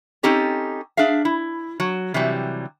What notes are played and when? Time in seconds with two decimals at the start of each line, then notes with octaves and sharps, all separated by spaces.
0.23 C4 C#4 D#4 G4 A4
0.97 D4 G#4 E5 F5
1.25 E4
1.80 F#3
2.14 C3 E3 F#3 G3